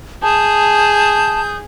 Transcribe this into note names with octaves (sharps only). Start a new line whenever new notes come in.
G#4 A5 D#6 G6